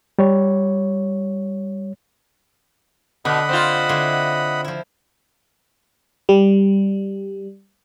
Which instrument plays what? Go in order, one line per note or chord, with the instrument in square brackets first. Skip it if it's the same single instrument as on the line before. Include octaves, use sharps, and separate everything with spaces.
[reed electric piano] G3 C#5
[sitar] B2 [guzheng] D3 [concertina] D#5 F#5 B5
[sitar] C4 F4
[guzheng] D3 E4 C6
F3 E4
[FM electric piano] G3